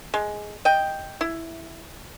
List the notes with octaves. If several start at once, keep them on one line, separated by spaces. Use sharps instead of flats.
G#3
D#5 G5
E4